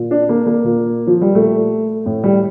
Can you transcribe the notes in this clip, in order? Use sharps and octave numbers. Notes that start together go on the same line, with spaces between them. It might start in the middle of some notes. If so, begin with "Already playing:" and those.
Already playing: A#2
D4
A#3
A#3
A#2
F3
G3
A#2 A3
A2
G3